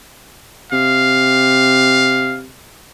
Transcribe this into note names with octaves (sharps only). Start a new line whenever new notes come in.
C3 F5